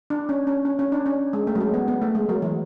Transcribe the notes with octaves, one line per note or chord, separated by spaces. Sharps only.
D4
C#4
C#4
C#4
C#4
D4
C#4
G#3
A3
F#3
G#3
B3
B3
A3
G#3
F#3
E3